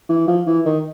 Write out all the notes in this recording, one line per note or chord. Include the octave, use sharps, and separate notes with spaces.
E3
F3
E3
D#3